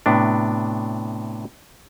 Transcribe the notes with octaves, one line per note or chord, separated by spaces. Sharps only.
A2 C3 B3 D4